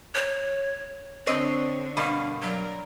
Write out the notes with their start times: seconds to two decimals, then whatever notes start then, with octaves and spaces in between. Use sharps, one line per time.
0.15 C#5
1.27 D3 C4 D4 C5 C#5 D#5
1.97 G2 B2 A#3 F5
2.42 F#3 A#4 D5